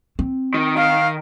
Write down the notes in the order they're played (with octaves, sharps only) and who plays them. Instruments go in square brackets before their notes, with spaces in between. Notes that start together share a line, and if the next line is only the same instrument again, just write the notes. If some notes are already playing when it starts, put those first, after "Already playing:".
[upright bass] C4
[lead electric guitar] D#3
[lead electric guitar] D#3 [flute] F5